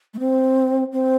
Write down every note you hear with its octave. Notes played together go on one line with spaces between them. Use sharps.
A3
C4
C4